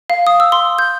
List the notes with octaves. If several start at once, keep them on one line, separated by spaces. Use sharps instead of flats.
F5
D#6
E6
C6
G6